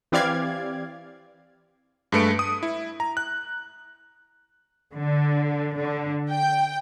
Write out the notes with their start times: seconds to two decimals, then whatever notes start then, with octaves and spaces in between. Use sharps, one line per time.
0.12 E3 C4 G4 D5 F5 G#6
2.12 G2 G#3 A3 B4 C#7 D7
2.39 D#6
2.63 E4
3.00 A#5
3.17 F#6
4.95 D3
5.79 D3
6.30 G5